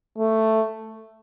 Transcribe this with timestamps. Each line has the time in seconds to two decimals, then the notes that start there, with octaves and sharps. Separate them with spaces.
0.18 A3